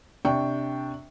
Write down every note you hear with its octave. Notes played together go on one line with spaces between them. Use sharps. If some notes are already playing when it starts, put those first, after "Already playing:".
C3 D4 G5 C#6